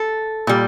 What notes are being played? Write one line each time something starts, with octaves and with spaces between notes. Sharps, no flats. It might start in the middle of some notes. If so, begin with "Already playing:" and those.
Already playing: A4
A#2 G3